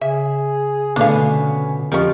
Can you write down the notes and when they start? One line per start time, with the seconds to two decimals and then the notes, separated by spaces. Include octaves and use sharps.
0.01 C#3 G#4 E5
0.96 B2 D3 A3 B3 C#4 D4 A4 F5
1.92 F2 C#4 F4 G4 A#4